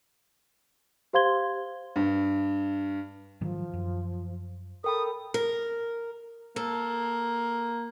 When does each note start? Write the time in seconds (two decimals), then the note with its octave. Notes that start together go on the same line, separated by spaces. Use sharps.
1.13 G4 C5 F5 C6 G#6 G7
1.96 G2
3.41 G#2 D#3 F3 F#3
3.74 F#2
4.84 A4 A#4 G5 B5 D#6
5.34 A#4
6.56 A#3 A4